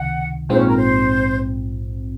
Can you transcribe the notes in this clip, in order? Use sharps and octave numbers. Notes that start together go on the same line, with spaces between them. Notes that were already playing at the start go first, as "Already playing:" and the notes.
Already playing: C#2 C3 D#3 F#5
A#1 G#2 F3 C4 C5
C#4
A#4
C5